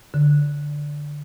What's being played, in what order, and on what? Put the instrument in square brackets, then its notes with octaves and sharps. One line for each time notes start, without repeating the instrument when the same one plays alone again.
[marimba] D3